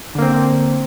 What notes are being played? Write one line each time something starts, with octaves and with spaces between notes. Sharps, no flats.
D3 A#3 C4